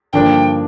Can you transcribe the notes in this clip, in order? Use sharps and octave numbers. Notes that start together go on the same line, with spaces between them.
G2 D3 F3 A#3 D4 G5